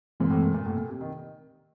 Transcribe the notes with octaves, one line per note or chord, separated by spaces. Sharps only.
A#2 E3 G#3 C4
A2
A#2
A#2
A2
A#2
C3
D#3